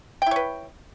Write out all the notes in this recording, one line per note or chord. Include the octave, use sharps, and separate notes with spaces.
E4 B4 C#5 G5